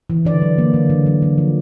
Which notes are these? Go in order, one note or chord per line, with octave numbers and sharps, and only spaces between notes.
E3
D3 D5
F#3
A#3
D3
D3
F#3
D3
F3